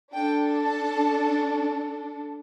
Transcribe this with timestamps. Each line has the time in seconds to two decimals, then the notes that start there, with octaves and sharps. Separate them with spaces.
0.13 D4 A4 G5
0.66 A5